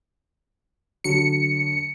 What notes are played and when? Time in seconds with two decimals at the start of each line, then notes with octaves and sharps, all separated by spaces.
1.04 D3 F#3 C#7